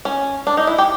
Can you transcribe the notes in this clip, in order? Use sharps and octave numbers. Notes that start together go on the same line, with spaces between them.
C#4
D4
D#4
E4
G4